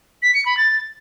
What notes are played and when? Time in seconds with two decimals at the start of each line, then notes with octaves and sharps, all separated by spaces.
0.22 B6
0.34 C#7
0.46 B5
0.57 A6